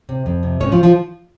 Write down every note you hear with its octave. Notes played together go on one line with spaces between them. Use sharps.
C3
F2
C3
G#2 C#4 C#5
F3 F4
F3 F4